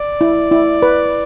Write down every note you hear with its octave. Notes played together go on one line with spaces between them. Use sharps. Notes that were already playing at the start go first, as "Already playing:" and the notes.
Already playing: D5
E4
E4
B4